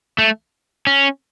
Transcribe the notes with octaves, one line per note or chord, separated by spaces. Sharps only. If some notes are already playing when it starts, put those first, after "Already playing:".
A3
C#4